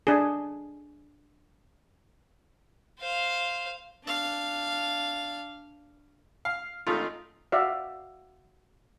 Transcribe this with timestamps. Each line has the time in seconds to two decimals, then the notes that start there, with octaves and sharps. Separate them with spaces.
0.07 D4 G#4
2.99 C5 F5
4.04 D4 F5
6.45 F5
6.87 G#1 A3 D#4 F4
7.52 F#4 D5 E5 F5